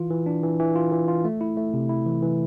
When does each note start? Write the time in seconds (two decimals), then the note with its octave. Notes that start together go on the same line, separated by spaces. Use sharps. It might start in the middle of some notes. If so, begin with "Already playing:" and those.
Already playing: E3 F4
0.10 E3
0.26 D4
0.43 E3
0.60 E3
0.75 F4
0.92 E3
1.08 F4
1.25 A3
1.41 E4
1.57 A3
1.74 C3
1.89 E4
2.06 E3
2.22 E3